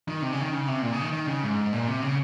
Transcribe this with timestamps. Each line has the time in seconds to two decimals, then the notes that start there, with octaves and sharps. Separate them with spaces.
0.08 D#3
0.22 C3
0.32 C#3
0.42 D#3
0.53 C#3
0.68 C3
0.82 A#2
0.93 C#3
1.02 D#3
1.13 D#3
1.27 C#3
1.43 G#2
1.73 A#2
1.88 C3
2.02 C#3